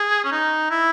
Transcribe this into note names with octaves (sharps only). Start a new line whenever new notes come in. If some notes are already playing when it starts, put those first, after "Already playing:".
Already playing: G#4
C#4
D#4
E4